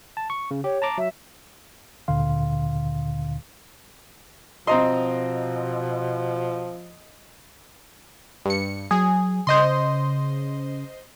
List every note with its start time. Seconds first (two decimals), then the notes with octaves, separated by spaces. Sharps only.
0.17 A5
0.30 C#6
0.51 C#3
0.64 G4 C#5
0.82 A5 A#5 D6
0.98 F#3 E5
2.08 D2 A#2 D3 F5 C6
4.67 B2 F3 C4 D#5 A#5 C6
8.46 G2 C#7
8.91 F#3 G#4
9.47 C#3 C5 D#5 C6